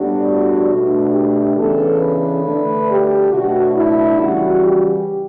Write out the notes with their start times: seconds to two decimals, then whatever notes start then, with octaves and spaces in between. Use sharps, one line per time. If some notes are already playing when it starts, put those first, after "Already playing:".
Already playing: A2 G3 B3 D4 F#4
0.69 B2 A3 D4
1.12 G4
1.56 C#3 E3 B3 D4 A4
2.00 B4
2.43 D3 A3 D4
2.87 G4
3.31 B2 F#3 A3 D4 F#4
3.75 E4
4.18 C#3 E3 G3 F#4
4.63 G4